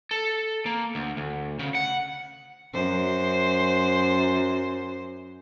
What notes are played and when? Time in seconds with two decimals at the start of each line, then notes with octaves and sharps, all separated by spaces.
0.11 A4
0.66 A#3
0.95 D2
1.17 D2
1.59 C#3
1.75 F#5
2.73 F#2 C5